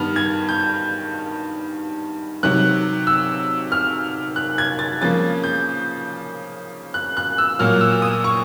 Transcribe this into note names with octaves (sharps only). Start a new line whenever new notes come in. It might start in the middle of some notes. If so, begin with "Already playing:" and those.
Already playing: G2 D#3 G3 B3 F6
G#6
G6
C3 D#3 F#3 F#6
E6
F6
F#6
G#6
A6
C#3 F3 A#3 A6
G6
F#6
F#6
E6
A#2 F#3 A#3 F6
E6
D#6
C#6